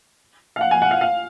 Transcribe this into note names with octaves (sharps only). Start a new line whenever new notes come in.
F5
F#5
G#5
F#5
F5
F5